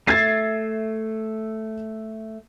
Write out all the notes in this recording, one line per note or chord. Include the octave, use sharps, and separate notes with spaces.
A3 E5 G#6 A6 C7